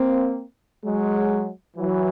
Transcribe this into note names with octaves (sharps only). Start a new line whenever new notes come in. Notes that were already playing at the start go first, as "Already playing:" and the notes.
Already playing: A#3 C4
F#3 G#3
E3 F#3